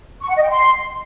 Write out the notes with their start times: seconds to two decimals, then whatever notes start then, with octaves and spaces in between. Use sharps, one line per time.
0.22 C#6
0.29 F#5
0.36 D#5
0.43 G5
0.50 C6